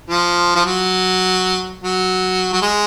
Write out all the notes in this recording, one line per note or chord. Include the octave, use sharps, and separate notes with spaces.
F3
F3
F#3
F#3
F#3
G#3